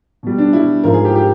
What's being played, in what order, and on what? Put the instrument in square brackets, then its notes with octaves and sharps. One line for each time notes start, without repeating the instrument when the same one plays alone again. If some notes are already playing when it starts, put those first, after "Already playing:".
[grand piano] B2 G3
D4
B2 G3 E4
G#2 F3 A#4
G#4
G4
G4